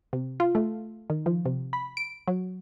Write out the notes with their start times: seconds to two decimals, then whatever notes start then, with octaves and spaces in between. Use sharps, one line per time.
0.13 C3
0.40 F4
0.55 A3
1.10 D#3
1.26 F3
1.46 C3
1.73 B5
1.97 D7
2.28 F#3